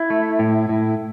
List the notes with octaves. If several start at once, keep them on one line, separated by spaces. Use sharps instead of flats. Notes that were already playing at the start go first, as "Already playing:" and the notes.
Already playing: E4
A3
A2
A2